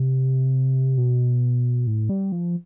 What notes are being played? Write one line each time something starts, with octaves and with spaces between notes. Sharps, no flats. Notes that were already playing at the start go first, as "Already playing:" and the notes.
Already playing: C3
B2
A2
G3
F3